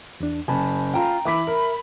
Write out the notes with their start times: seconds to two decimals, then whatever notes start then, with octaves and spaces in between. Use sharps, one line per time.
0.20 E2 D4
0.48 F#1 G#5 A5 B5
0.94 F4 G5 A#5
1.25 E3 E5 B5 D6 B6
1.47 A#4